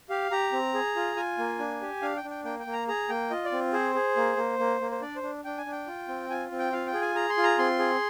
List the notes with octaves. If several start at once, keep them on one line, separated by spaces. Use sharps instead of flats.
G4 F5
G4 A#5
C4
G#4
F4
F4 G#5
A#3
D4
G4
D4 F5
G5
D4
G5
A#3 G5
G5
A#3
A#5
G#4 A#5
A#3 G5
F4 D#5
D5
C4
G#4 C5
G#4
A#3
A#3
A#3
A#3
C5
D4 D5
C5
D4
D4 G5
G#5
D4
G5
F4
C4
F4 G#5
C4
G5
F4 F5
G5
G#4
G#5
G#4 A#5
C6
F4
A#5
C4 C6
G#4